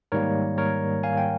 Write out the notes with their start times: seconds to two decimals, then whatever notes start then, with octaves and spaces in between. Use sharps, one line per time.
0.12 G#2 D#3 G3 A#3 A#4 C#5
0.58 A#4 C#5
1.03 F5 G#5
1.17 G5